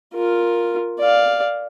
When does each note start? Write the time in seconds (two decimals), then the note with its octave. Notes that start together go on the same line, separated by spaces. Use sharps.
0.14 F4 A#4
0.99 D5 F5